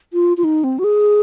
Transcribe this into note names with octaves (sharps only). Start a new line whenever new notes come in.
F4
F4
D#4
C4
F#4
G#4